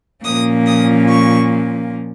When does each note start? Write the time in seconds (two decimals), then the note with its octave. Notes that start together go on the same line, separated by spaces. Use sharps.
0.24 A#2 F3 A#3 C#4 D#6
0.66 D#6
1.09 C#6